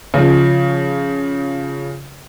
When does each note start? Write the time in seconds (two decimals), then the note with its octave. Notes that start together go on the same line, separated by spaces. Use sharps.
0.14 C#3 F3